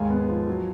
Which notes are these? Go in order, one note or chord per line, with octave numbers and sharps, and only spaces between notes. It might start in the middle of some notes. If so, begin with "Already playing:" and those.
Already playing: D#2 G#2 F5 G#5
B3
F3
F#3